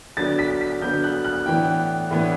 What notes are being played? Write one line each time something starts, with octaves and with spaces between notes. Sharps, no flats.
D3 F#3 B3 D4 A6
B6
B6
D3 F#3 B3 D4 G6
F#6
F#6
A2 E3 B3 D4 G5
A2 E3 B3 D4